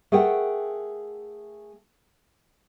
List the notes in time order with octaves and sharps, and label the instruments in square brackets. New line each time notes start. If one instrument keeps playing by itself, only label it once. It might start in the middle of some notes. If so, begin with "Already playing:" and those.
[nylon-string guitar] A3 G#4 A#4 F#5 G5